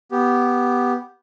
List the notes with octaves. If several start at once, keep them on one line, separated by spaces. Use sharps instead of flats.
B3 G4